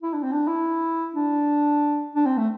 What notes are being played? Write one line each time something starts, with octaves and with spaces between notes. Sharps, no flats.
E4
D4
C4
D4
E4
D4
D4
C4
A3